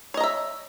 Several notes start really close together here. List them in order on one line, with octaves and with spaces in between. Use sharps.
C#5 D#5 A#5 E5